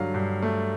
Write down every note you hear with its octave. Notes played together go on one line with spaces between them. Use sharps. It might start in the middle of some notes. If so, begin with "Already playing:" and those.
Already playing: G2 D3 F#3 F5
G2
A3